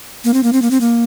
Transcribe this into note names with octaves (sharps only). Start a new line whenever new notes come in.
A#3
C4
A#3
C4
A#3
C4
A#3